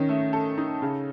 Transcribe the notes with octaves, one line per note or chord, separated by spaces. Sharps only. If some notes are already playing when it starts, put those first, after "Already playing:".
Already playing: D#3 C#4 D#4
A3
A4
D#4
C#3